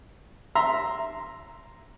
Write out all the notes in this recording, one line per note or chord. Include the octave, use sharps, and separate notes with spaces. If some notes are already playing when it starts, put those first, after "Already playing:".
E5 A#5 C6